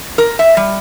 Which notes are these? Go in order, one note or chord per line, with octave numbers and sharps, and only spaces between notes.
A#4
E5
G3